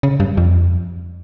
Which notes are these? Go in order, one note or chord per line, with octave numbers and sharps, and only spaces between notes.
C#3
G2
F2